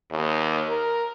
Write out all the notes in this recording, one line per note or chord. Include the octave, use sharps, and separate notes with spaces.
D#2
A#4